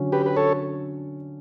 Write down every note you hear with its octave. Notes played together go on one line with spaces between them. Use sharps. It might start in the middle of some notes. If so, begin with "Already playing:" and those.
Already playing: D3 F#3 C#4
G4 B4
B4
A4 C#5